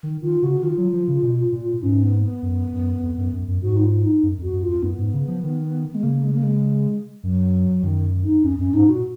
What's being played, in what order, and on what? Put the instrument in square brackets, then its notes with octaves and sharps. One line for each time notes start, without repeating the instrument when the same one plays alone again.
[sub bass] D#3
[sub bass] D#3 [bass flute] F4
[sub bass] C#3 [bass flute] F#4
[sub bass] D#3 [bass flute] F4
[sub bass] F#3
F3
C#3
B2
A#2
[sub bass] G#2 [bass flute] C#4
[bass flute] B3
B3
[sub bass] F#2
F#2
F2
F#2
F#2
F#2
[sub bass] G#2 [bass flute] F#4
[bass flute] D#4
F4
D#4
[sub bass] F#2
[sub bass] F2 [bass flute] F#4
[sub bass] F#2
[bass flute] F4
[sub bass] F2
[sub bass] F#2 [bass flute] B3
[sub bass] G#2
C#3
F3
D#3
[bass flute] G#3
[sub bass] C#3 [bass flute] A#3
[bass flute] G#3
A#3
G#3
[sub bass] F#2 [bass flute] F#3
[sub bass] F#2 [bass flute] D#3
[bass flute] D#4
[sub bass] F2 [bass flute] C#4
[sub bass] F#2 [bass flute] C#4
[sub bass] G#2 [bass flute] D#4
[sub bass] A#2 [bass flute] F#4